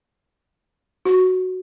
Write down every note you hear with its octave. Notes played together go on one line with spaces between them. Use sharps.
F#4